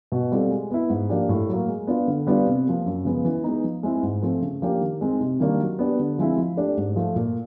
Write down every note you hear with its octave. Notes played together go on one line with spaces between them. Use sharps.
B2
G3 C4 F4 A4
G#3
B3 E4
G#2
F3 A#3 D4 G4
A2
F#3 A#3
G#3
B3 D4 F4
D3
G3 B3 D4 F4
C3
F3 A#3
F#2
C#3 F3 G#3 B3
E3
G#3 B3 D#4
F3
G#3 C4 E4 G#4
G#2
F3 A3 C4
C#3
F3 A#3 D4 G4
D#3
G#3 C4 D#4
C3
D#3 G3 A#3 D4
F#3
B3 D4 G4
D3
F3 G#3 C4 E4
F3
A3 D4 G4
G#2
F3 A3
A#2